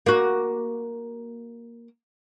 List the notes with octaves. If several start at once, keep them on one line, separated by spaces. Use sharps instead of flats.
A#3 F#4